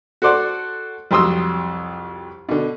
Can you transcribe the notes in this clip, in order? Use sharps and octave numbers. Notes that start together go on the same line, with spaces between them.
F#4 A4 C5 D5 F#5
C2 F2 F#3 C6 D#6 E6
B2 D3